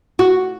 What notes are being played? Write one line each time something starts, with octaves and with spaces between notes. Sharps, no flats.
F#4